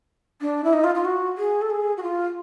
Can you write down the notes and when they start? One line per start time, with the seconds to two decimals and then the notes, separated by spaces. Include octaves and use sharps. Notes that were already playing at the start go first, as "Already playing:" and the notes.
0.41 D4
0.64 E4
0.73 D#4
0.84 F4
0.95 F4
1.05 F#4
1.38 G#4
1.61 A4
1.70 G#4
1.97 F#4
2.03 F4